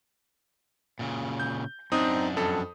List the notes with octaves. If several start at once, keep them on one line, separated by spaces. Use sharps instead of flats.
A#2 C#3
G6
F#2 C4 D4 D#4 D#6
F2 A4